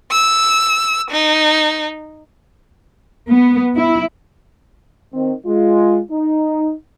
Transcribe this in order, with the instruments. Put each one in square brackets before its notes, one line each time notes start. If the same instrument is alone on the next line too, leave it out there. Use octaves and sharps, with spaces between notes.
[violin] E6
D#4
[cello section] B3
E4
[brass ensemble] D#3 C4
G#3 F4
D#4